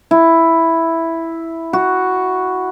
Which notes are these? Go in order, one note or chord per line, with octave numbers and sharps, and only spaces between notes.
E4
F#4